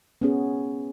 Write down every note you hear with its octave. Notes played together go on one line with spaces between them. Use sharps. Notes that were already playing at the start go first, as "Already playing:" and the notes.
B3 C#4 G#4